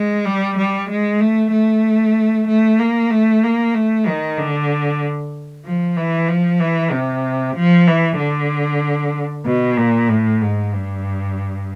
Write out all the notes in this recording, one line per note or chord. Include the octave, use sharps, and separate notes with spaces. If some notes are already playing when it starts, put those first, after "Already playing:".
Already playing: G#3
G3
G3
G#3
A3
A3
A3
A#3
A3
A#3
A3
D#3
D3
F3
E3
F3
E3
C3
F3
E3
D3
B2
A#2
A2
G#2
G2